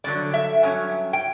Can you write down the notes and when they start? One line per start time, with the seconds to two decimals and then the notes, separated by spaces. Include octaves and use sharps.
0.04 G2 D3 F#3 D5
0.34 E5
0.63 G2 F#3 C#4
1.13 G5